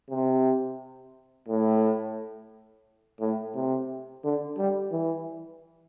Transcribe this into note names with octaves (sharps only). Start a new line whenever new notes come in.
C3
A2
A2
C3
D3
G3
E3